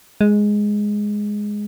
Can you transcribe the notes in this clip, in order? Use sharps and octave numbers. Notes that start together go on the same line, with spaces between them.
G#3